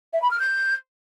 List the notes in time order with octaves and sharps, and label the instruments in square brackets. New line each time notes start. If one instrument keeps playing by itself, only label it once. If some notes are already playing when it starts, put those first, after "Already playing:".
[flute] E5
B5
F6
G6